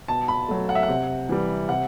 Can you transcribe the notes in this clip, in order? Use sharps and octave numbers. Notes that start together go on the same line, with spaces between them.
B2 A5
B5
F#3 A3
F#5
E5
F#5
C3
E3 G3
C3 F#5